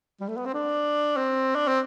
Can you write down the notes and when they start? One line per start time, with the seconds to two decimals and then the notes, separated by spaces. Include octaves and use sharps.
0.21 G3
0.29 A3
0.37 B3
0.45 C4
0.54 D4
1.17 C4
1.55 D4
1.68 C4